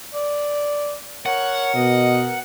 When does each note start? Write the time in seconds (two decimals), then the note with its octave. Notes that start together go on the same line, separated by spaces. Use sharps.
0.14 D5
1.26 A#4 C#5 F#5
1.74 B2 D#5